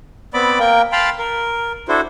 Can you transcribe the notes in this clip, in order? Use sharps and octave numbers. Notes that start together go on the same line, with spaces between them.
B3 C4 D5 B5 D6
A#3 A#4 G5
F5 G5 A5 B5 C6
A#4
D4 E4 F#4 A4 C5